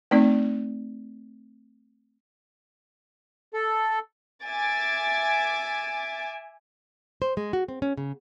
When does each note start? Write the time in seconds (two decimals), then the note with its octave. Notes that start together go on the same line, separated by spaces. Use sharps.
0.11 A3 C4 D#4 D5
3.54 A4
4.43 E5 G#5 D6 A6
7.22 C5
7.37 G#3
7.53 F#4
7.68 C4
7.82 C#4
7.97 C#3